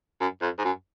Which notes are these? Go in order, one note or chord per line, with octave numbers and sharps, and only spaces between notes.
F#2
F2
G#2
F#2